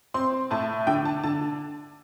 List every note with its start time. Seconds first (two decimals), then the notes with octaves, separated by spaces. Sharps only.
0.14 C4 C6
0.51 A2 A5
0.87 D3 G5
1.05 A5
1.24 D3 A5